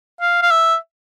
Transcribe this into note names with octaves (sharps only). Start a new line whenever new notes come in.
F5
F5
E5